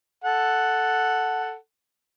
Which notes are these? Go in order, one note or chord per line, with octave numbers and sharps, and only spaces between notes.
A4 F#5